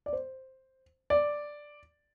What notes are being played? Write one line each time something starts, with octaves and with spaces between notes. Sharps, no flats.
D5
C5
D5